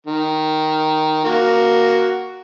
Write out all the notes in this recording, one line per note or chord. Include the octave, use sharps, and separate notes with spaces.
D#3
A#3 F#4